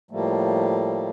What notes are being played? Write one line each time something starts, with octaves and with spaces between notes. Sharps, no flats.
A2 F3 G3 A3 A#3